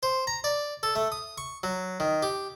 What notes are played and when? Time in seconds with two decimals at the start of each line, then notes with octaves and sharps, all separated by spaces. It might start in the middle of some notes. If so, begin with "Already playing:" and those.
0.03 C5
0.27 A#5
0.44 D5
0.83 A4
0.96 A3
1.12 D#6
1.38 C#6
1.63 F#3
2.00 D#3
2.23 G4